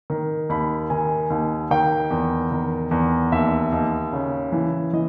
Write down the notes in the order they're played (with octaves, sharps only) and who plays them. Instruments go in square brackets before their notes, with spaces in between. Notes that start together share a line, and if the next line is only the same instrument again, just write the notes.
[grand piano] D#3
D#2 B5
D#3 G#5
D#2
D#3 G5
E2
D#3
E2
D#2 E5
D#2
C#3
E3
E3 D#5